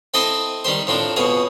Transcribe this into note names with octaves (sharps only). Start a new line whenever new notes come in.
C4 E4 A4 D#5 C6 D#6
D#3 G3 G4 C5
A2 F3 C4 D4
F2 B2 G#4 C#5